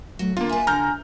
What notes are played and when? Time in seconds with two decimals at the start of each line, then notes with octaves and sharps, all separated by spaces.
0.19 F#3 A3
0.37 D3 A#3 B3 F4
0.49 E4 B4 G#5
0.67 D3 A#5 F6 G6